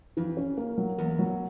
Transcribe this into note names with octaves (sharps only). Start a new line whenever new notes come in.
F2 E3
C#4
A#3
F#3
E2 A#3
F#3